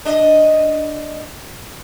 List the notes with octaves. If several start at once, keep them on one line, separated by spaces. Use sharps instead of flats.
D4 D#5